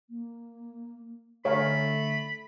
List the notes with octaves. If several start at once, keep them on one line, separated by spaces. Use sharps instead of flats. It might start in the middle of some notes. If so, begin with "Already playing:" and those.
A#3
D3 A3 C#5 F5 A#5 B5